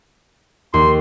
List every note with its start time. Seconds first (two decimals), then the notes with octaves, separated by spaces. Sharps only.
0.74 D#2 C6